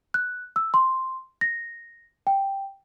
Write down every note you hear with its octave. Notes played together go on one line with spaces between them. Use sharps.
F#6
E6
C6
A#6
G5